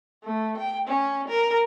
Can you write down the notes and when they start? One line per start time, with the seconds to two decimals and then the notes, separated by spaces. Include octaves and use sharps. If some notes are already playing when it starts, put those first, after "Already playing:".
0.24 A3
0.57 G5
0.87 C#4
1.28 A#4